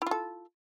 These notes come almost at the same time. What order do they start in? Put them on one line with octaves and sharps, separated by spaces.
E4 F4 A4